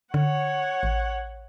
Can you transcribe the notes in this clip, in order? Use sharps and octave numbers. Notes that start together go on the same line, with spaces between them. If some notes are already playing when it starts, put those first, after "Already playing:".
D3 C#5 F#5
A1